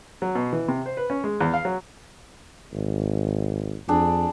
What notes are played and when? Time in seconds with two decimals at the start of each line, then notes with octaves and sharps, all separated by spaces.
0.22 F#3
0.35 B2
0.53 E3
0.68 C3
0.86 C5
0.97 B4
1.10 C#4
1.24 G#3
1.41 E2
1.53 F5
1.65 F#3
2.73 G#1
3.88 F2 D4 G#4